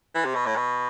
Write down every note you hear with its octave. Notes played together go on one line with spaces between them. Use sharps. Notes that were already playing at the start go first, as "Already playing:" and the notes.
E3
C3
B2
A2
B2